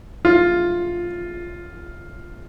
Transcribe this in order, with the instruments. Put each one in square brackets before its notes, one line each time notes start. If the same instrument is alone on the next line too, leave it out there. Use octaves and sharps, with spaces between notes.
[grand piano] F4